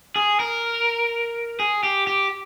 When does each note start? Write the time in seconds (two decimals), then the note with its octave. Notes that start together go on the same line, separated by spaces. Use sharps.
0.16 G#4
0.40 A#4
1.60 G#4
1.83 G4
2.07 G4